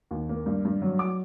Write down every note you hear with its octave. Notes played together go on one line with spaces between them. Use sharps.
D#2
A#3
G2
G2
F#3
D6